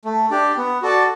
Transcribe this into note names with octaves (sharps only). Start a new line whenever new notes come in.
A3
D4 G4 D5
B3
F#4 A4 D5 A5